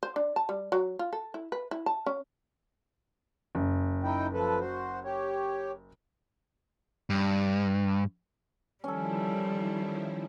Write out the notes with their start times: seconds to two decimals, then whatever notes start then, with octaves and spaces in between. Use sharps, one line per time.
0.03 C5
0.16 D4
0.36 A5
0.49 G3
0.72 F#3
0.99 F4
1.13 A4
1.34 E4
1.52 B4
1.71 E4
1.86 A5
2.06 C#4
3.55 F#1
4.03 D#4 E4 G5
4.33 F3 A4 B4
4.60 F#4 C5
5.05 G4 C#5
7.10 G2
8.84 D#3 F3 G3 C#4 E4 A4